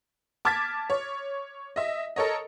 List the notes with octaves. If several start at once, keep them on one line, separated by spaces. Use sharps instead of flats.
A5 D6 F6 G#6 A6 B6
C#5
D#5 E5
A4 A#4 C#5 D#5